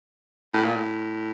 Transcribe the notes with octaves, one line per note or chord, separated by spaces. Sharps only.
A2
A#2
A2